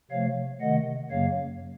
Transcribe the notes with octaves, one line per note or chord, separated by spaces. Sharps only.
C3 F3 A3 C#5 F5
C3 D#3 A3 D#5 F#5
F#2 C#3 F#3 A#3 C#5 F5